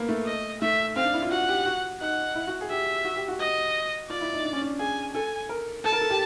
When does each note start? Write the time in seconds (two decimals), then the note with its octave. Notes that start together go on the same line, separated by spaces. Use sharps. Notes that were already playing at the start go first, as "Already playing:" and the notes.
Already playing: A#3 B3
0.09 A3
0.26 D#5
0.61 A3 E5
0.96 C4 F5
1.05 D4
1.14 E4
1.22 F4
1.31 F#4 F#5
1.49 G4
1.66 F#4
2.01 D#4 F#5
2.35 E4
2.47 F#4
2.61 G#4
2.70 G4 E5
3.05 F#4
3.16 G4
3.28 F#4
3.40 D#5
4.10 F4 D5
4.21 E4
4.33 D#4
4.45 D4
4.53 C#4
4.61 D4
4.79 G#4 G#5
5.14 A4 G#5
5.49 A#4
5.84 A4 A5
5.92 A#4
6.01 A4
6.10 G4